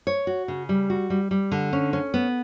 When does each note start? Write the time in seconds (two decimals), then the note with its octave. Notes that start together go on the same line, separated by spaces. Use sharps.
0.07 C#5
0.27 F#4
0.48 C#3
0.69 G3
0.90 F#4
1.10 G3
1.31 G3
1.52 D3
1.73 C#4
1.93 C#4
2.14 B3